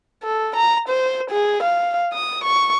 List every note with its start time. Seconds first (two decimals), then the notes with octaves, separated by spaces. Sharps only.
0.23 A4
0.56 A#5
0.88 C5
1.30 G#4
1.63 F5
2.14 D#6
2.44 C#6